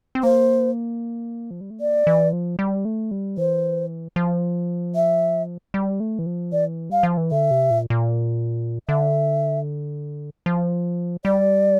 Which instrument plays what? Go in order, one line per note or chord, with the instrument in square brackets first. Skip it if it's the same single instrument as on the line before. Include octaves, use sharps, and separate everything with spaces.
[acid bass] C4
[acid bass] A#3 [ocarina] C5
[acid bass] F3
G3
A3
[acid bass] A#3 [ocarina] D5
[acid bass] E3
F3
G3
A3
G3
[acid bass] E3 [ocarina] C5
[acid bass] F3
[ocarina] E5
[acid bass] G3
A3
E3
F3
[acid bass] E3 [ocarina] D5
[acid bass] G3 [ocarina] F5
[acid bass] F3
E3
[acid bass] D3 [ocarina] E5
[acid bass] C3
A#2
A#2
[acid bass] D3 [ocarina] E5
[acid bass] F3
[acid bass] G3 [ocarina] D5